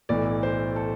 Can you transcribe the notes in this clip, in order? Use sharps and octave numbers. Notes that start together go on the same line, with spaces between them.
B1 A2 E3 D5
C5
A4